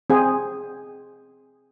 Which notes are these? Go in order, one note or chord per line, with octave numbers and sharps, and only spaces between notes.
C4 G#4